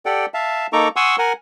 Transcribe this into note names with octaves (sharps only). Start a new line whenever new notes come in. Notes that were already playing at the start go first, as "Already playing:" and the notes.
G4 A4 D5 F#5 G5
E5 F5 A5
A#3 D#4 A4 A#5 C#6 D6
F#5 G#5 C6 C#6 D#6 E6
A#4 F#5 G#5